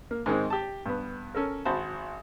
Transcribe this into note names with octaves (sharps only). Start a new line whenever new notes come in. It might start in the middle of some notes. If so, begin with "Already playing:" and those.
A#3
G#2 D#3 G#3 C4
G4 A5
G2 B3
C#4 A4 A#4
G#1 F#4 C5 A5 B5